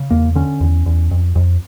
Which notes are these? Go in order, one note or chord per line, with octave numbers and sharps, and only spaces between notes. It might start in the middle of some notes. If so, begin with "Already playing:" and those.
Already playing: C#3
E2 A#3
D3 C#4
E2
E2
F2
F2